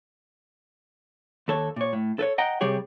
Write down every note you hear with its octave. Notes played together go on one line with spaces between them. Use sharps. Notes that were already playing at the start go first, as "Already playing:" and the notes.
D#2 A4 C#5
A#2 C#5
A2
A4 B4 C#5
D#5 F#5 G5 A#5
C3 G3 G4 G#4 C#5